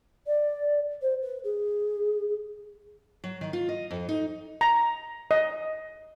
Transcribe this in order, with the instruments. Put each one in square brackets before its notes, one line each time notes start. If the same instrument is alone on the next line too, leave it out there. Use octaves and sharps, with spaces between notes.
[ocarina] D5
C5
B4
G#4
[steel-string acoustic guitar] F#3
D#3
F4
D#5
F2
D#4
[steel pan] A#5
D#5